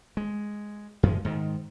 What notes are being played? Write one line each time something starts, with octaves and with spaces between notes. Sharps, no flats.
G#3
F#2 F3 G#3
G#2 D#3